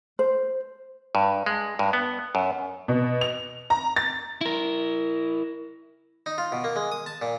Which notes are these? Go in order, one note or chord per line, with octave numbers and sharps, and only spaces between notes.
C5
G2
G#3
G2
B3
F#2
B2
F7
A#5
A6
E4 A#4
D#4
F4
B2
A#3
G#3
D#6
A5
A#2